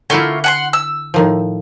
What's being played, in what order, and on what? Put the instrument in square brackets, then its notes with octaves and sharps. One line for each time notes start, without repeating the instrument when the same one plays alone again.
[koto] D3 E4 [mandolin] A3 A#3 F4
[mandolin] F#5 G#5 C6
E6
[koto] A2 D#3 F3